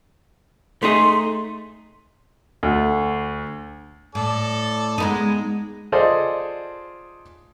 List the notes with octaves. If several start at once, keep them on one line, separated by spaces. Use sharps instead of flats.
A3 D#4 G#4 C6
D2
A2 A4 D5
G#3 B3 D#4
F4 G#4 A4 C5 D5 D#5